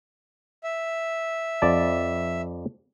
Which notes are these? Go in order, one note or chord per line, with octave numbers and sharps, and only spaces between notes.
E5
F2 D5 A5